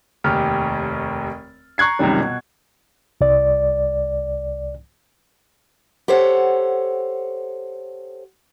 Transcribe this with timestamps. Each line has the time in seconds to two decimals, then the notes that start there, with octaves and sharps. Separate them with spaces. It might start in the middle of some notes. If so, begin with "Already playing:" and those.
0.24 F1 D#2 G4 F6
1.78 A#5 C#6 F#6 G#6 C7
1.99 C#2 F#2 C3 D#3 G3
2.20 B2
3.21 C2 D5
6.08 G4 A4 C5 C#5 F#5